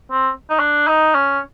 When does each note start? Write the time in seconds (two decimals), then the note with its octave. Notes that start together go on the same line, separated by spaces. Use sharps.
0.11 C4
0.50 D#4
0.59 D4
0.87 D#4
1.15 C#4